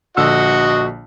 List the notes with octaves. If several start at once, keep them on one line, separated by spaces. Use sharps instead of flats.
A#1 D3 F#4 D#5 F#5 E6